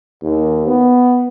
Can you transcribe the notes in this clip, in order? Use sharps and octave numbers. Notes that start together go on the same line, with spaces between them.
D#2
B3